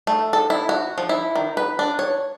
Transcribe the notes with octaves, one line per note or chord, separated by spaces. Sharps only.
A3
A4
E4
F#4
F3
E4
D#3
B4
D4
C#5